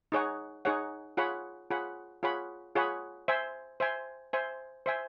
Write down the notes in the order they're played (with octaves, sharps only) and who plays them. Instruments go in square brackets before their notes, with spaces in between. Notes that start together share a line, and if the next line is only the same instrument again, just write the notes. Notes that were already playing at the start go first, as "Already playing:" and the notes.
[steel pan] D#4 G#4 C#5 F#5
D#4 G#4 C#5 F#5
F4 G#4 C#5 F#5 B5
F4 G#4 C#5 F#5 B5
F4 G#4 C#5 F#5 B5
F4 G#4 C#5 F#5 B5
C5 E5 G#5
C5 E5 G#5
C5 E5 G#5
C5 E5 G#5